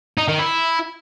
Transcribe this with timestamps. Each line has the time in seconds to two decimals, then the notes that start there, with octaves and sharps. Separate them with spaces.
0.18 D#4
0.28 D#3
0.39 E4